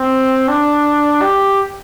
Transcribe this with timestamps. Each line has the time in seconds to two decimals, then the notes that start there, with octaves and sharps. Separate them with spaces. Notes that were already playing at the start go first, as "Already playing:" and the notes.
Already playing: C4
0.48 D4
1.22 G4